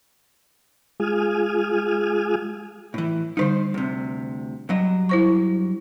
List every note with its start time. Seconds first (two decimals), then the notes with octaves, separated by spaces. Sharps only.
1.00 G#3 F4 G#4 G#5 D#6 F6
2.94 A2 E3
3.37 D3 G3 D#4 B4 C5
3.74 D2 C3
4.69 G2 F#3 D#5
5.09 E4 C5 C#6